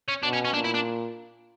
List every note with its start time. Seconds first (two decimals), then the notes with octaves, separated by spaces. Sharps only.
0.08 C#4
0.23 B2 D4
0.33 C#4
0.45 C#4
0.54 A#2 D4
0.65 E4
0.75 D4